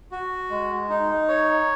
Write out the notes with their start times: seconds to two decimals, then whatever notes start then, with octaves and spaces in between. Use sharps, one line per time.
0.12 F#4
0.50 G#3
0.90 D#4
1.29 C#5